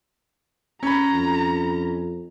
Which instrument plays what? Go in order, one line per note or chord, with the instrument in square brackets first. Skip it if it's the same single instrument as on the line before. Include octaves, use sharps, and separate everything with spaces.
[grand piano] C#4 B5 [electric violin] A#5
[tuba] F2